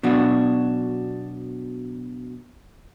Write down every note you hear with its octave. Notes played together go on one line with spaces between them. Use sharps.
B2 F#3 D4 F#4